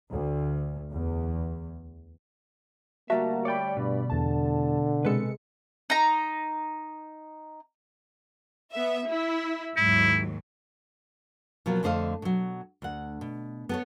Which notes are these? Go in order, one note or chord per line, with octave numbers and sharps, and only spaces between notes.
D2
E2
D2 G3 A#3 F#4 E5 A5 A#5
C#5 D5 G5 B5
G2 B2
E2 D3 A5
C3 G#3 A4 B4 C#7
D#4 A#5
B3 E5
E4
D#2 G#2 F#3 E4
B2 F3 F#3 A#3
F2 D3 A3 C5 D#5 F5
B2 F#3
D2 F#5
B2
B3 A4 C#5